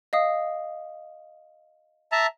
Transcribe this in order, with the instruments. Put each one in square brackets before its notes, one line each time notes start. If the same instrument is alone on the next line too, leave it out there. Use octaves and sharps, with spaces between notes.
[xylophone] D#5 F5 D#6
[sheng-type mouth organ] E5 A5 A#5